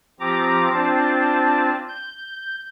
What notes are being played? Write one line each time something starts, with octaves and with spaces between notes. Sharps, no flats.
F3 C4 F4 G4 A#5 D6
C4 D4 F4 C5 A5
G6